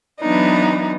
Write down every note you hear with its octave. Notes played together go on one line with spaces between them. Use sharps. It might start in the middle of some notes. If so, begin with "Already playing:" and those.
E3 F#3 B3 D4 D#4